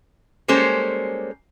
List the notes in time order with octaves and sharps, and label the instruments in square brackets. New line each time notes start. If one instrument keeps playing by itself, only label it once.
[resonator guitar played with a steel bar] G3 G#3 A#3 C#4 A4 C5